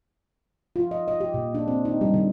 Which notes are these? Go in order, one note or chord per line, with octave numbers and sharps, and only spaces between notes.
F4
D#5
D#5
G4
A#2
D4
C4
D#4
G3
D3